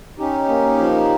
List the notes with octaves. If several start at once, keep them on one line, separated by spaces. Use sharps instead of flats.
C#4 D#4 G4
A#3
F3